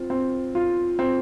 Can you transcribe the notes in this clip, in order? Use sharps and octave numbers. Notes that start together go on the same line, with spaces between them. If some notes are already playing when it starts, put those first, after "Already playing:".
Already playing: C4 F4
C4
F4
C4